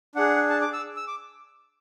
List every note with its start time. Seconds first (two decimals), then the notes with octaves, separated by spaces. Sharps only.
0.15 D4 G#4 F#5
0.50 A5
0.61 D6
0.73 E6
0.96 E6
1.08 D6